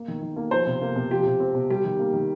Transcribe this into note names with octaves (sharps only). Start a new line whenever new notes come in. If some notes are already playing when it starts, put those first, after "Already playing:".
Already playing: A#3
D#3
D#3
A#3
F3 C5
C3
A#3
C3
F3 G4
C3
C4
C3
G3 G4
D#3
A#3
D#3